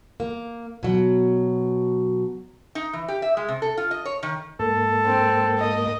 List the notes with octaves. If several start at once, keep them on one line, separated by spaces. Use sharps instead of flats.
A#3
B2 F#3
D#4
E3
G4
E5
G#3
C3
A4
F4
D#5
C#5
D#3
G#2 A#3 A4
C4
D#5